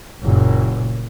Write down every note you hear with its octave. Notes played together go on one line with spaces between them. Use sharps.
F#1 A#2